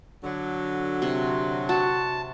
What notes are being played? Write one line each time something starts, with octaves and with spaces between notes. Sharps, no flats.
D3 F#3
C3
F#4 A5